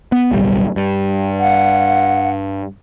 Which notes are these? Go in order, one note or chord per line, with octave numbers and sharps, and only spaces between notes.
B3
D1 B1 G3
G2
F5 F#5